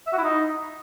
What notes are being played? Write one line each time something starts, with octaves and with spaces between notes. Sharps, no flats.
E5
F#4
E4
D#4